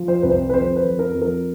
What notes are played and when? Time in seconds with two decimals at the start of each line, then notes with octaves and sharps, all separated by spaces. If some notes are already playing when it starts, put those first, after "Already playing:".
Already playing: F3
0.08 C5
0.22 C2 B4
0.31 C5
0.49 B4
0.53 F2 C5
0.76 B4
0.83 F2
0.99 A#4
1.14 F2
1.22 A#4